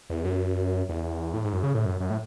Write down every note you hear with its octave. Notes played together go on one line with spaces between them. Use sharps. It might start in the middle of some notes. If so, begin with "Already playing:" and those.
E2
F#2
E2
A2
G#2
F#2
C#3
A2
F#2
F#2
A2